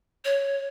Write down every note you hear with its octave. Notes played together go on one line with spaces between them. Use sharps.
C#5